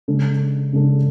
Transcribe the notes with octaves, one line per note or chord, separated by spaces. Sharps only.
C#3 G#3 D4 A4
C#3 G#3 D4 A4